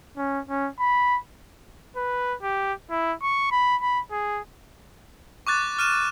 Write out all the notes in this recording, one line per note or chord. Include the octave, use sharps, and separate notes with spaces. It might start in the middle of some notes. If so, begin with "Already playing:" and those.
C#4
C#4
B5
B4
G4
E4
C#6
B5
B5
G#4
C#6 D6 F#6 A6
F6 D#7 E7